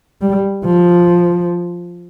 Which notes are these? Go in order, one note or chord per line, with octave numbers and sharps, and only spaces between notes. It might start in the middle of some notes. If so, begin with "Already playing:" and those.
G3
F3